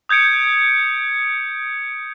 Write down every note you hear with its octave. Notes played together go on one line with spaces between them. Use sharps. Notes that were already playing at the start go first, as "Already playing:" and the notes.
D#6 G6 G#6 C#7 D7